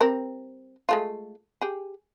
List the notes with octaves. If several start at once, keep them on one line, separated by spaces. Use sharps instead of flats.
G3 C4 A#4
G#3 A3 F4
G4 G#4